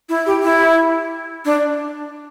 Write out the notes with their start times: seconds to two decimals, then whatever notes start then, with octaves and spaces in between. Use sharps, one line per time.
0.09 E4
0.26 G4
0.43 E4
1.45 D4